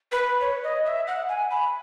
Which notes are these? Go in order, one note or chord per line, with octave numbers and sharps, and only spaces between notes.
B4
C#5
D#5
E5
F#5
G#5
B5